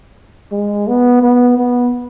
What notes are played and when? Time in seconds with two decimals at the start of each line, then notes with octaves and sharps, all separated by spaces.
0.52 G#3
0.87 B3
1.22 B3
1.58 B3